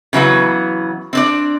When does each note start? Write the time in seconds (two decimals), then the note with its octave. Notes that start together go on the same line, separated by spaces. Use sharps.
0.13 C#3 E3 F#3 B3
1.13 C4 D4 D5